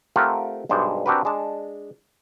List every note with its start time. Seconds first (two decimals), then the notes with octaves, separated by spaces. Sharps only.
0.16 A3 C4 F4 G4 A#4 F#5
0.69 B1 G2 G#3 C5 D5
1.06 C4 D4 F#4 G4 A#4 B4
1.25 G#3 D4 A5